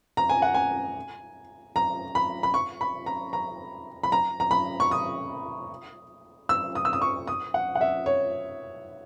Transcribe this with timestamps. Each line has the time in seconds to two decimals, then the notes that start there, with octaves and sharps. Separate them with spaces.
0.17 A#5
0.29 G#5
0.42 F#5
0.54 G#5
1.76 A#5
2.15 B5
2.43 B5
2.54 C#6
2.81 B5
3.06 A#5
3.33 A#5
4.03 B5
4.12 A#5
4.40 A#5
4.51 B5
4.80 C#6
4.91 D#6
6.49 E6
6.75 D#6
6.85 E6
6.93 D#6
7.02 C#6
7.27 D#6
7.54 F#5
7.75 F#5
7.81 E5
8.06 C#5